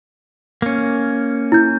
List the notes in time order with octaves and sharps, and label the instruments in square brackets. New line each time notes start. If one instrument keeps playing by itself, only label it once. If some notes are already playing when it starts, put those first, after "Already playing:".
[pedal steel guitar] A#3 C#4
[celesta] E4 G6